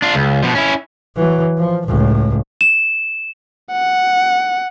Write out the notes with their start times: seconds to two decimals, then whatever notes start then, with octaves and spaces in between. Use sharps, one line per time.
0.02 D4 F4
0.15 C#2
0.43 B2 F3
0.55 C#4 E4
1.16 E3 F#3
1.58 F3
1.87 C#2 A2
2.61 E7
3.72 F#5